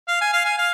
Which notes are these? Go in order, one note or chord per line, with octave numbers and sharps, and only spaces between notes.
F5
G#5
F5
G#5
F5